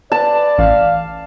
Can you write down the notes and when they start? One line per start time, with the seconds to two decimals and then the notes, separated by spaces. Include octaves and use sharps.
0.12 B4 D5 A5
0.58 A1 F5